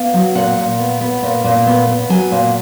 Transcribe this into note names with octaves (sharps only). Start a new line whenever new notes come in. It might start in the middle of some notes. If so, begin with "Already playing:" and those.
Already playing: B3 F5
F#3
A#2 F#5
A#2
B3
B3
A#2
A#2
B3
B3
F#3 G#5
A#2